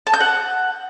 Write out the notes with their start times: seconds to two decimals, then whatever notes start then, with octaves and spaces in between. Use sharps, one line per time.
0.07 A5
0.14 G6
0.20 F#5